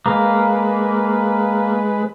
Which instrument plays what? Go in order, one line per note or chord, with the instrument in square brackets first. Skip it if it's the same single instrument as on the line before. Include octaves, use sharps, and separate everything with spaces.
[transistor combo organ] G#3 B4 [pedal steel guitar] A#3